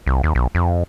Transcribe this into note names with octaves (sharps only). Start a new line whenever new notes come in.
C2
D#2
B1
F2